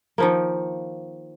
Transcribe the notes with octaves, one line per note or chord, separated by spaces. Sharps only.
D#3 F3 A#3